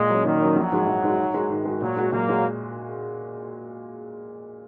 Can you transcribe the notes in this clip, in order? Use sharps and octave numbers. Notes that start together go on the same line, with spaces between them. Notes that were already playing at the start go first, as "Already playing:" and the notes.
Already playing: A#2 G#3
F#3 C#4
A#2 D#3
F#3 C#4
A#1 F#3
G#2 G#3 F#4
A#1
G#2 G#3 F#4
G#2
G#3 F#4
G#2 D#3
G#3 F#4
A#2 F#3
G#3 F#4
A#2 F#3 A#3
G#3 F#4